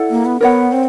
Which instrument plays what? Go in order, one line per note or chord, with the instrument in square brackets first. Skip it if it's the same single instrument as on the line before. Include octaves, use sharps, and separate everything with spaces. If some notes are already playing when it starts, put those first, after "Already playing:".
Already playing: [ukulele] E4 A4 D5 F#5
[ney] A#3
B3
[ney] B3 [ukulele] A#4 C#5 F#5
[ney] C4